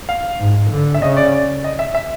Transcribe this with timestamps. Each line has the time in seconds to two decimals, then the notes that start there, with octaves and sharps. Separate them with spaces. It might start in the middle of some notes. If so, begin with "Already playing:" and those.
0.09 F5
0.40 G#2
0.71 D3
0.94 E5
1.02 C#3 D#5
1.17 D5
1.33 D5
1.64 D#5
1.79 E5
1.95 E5